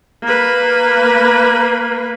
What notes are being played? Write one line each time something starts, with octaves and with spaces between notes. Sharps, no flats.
A#3 B4